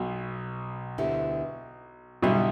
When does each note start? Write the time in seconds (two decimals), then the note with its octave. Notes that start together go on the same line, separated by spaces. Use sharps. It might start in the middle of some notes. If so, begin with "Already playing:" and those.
Already playing: B1 B2
0.98 D2 D3 B3 E4 G4
2.22 B1 B2 D3 G3 E4